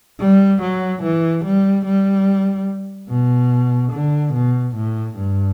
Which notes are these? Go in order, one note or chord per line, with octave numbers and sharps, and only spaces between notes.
G3
F#3
E3
G3
G3
B2
D3
B2
A2
G2